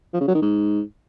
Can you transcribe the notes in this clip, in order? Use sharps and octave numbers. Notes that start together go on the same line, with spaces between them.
F3
C#3
F#3
D#3
G#2